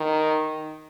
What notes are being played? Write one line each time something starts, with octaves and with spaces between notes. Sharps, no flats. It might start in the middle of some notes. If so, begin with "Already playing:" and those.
Already playing: D#3